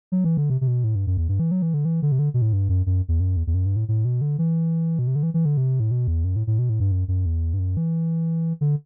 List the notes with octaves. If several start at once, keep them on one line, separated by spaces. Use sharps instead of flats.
F#3
E3
D3
C3
C3
B2
A2
G2
F#2
E2
G2
E3
F#3
E3
D3
E3
D3
C3
D3
B2
A2
G2
F#2
F#2
E2
F#2
E2
E2
F#2
G2
A2
A2
B2
D3
E3
B2
C3
D3
E3
E3
D3
C3
A2
B2
E2
F#2
A2
A2
B2
A2
G2
F#2
F#2
E2
G2
F#2
E3
D3